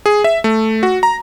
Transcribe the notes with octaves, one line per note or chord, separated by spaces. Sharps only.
G#4
E5
A3
F#4
A#5